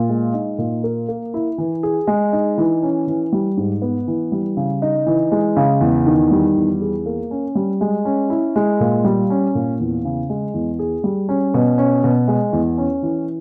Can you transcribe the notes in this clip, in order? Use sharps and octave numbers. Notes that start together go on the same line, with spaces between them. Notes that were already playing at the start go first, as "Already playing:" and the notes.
Already playing: A#2
G#3
D#4
A#2
A#4
A#3
E4
E3
G#4
G#3
D#4
E3
C#4
E3
G3
G#2
B3
E3
G3
C#3
D#4
E3
G#3
C#3
E2
D#3
G3
E2
G#4
A#3
C#4
G3
G#3
C#4
E4
G#3
A#2
G3
C#4
A#2
E2
C#3
G#3
E2
G#4
G3
C#4
B2
C#4
B2
G#3
E2
C#4
E3